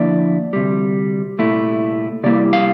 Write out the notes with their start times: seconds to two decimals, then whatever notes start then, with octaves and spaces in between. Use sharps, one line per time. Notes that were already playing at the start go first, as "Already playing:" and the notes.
Already playing: D2 D3 F3 A#3 E4 D5
0.53 D2 C3 G3
1.38 C2 A#2 A3 E4
2.23 C3 G3 A#3 E4 D5
2.53 F5